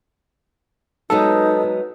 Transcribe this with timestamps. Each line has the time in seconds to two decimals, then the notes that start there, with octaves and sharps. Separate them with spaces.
1.10 F#3 G#3 B3 D#4 A4